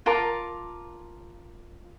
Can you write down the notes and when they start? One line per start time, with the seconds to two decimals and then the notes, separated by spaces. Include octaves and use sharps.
0.06 F4 A#4 A5 D6